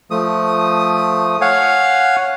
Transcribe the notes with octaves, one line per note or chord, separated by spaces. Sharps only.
F3 A3 D#6
C#5 F5 F#5 G#5